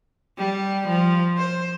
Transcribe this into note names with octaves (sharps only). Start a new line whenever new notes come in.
G3
F3
C5